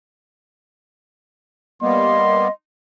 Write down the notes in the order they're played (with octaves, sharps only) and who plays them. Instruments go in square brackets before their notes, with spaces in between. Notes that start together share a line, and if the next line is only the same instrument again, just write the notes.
[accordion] G3 A#3 B3 [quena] D#5 [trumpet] C6